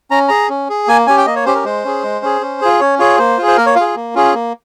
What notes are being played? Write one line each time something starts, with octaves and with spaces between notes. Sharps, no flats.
C#4 A#5
G#4 A#5
C#4
G#4
A#3 G#5
C#4 G4 G#5
G5
A#3 D#5
C#5
C#4 G4 C5
A#4
G#3 C5
C#4 G#4
G#3
C#4 G#4
C#4
F4 G#4
C#4 C#5
F4 G#4 C#5
A#3 C5
F4 G#4
C5
A#3 A#4
C#5
F4 G#4 F5
A#3
C#4 F4 G#4
A#3